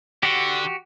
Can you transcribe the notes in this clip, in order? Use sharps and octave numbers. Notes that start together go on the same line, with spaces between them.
D3 F#4 G4